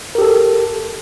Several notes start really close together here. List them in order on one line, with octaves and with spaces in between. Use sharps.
A#4 G4 A4